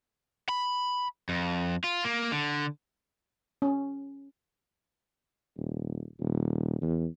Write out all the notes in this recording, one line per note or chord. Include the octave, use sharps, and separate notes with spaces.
B5
F2
F4
A#3
D3
C#4
D#1
D#1
E2